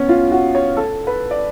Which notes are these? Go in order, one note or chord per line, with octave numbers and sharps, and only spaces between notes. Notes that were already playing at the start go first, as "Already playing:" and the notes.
Already playing: B3 C#4
F4
F#4
C#5
A4
B4
D5